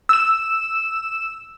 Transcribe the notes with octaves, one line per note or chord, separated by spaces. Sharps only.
E6 E7